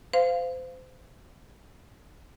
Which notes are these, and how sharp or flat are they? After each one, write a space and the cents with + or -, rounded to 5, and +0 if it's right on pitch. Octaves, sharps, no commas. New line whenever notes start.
C5 -30 F5 +0